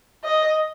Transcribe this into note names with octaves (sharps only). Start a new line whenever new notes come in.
D#5